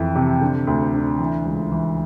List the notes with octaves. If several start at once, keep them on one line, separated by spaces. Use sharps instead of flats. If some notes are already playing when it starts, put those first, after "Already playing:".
Already playing: F2 E3
C3
D3
D2
D3
E3
C#2
E3